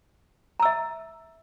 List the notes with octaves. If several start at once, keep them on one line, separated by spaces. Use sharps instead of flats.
E5 A#5 E6